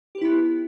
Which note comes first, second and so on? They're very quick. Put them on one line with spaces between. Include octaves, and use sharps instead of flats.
G4 B4 E4 B3